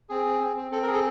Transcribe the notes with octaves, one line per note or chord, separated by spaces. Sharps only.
C4 G#4
C4
C4
C4
C4 A4
A#4
G#4
A4